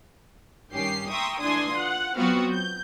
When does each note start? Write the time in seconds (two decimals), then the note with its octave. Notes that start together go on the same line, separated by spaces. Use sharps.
0.71 G2 D#3 C#4 G4 C7
1.11 E5 G5 A#5 C6 C#6 D#6
1.40 D3 E3 D4 G#5 C6 D#6
1.73 F4 F#5
2.17 F#3 B3 C4 F4 F#4 F5
2.50 G6